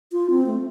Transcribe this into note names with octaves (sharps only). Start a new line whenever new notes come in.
F4
C4
A3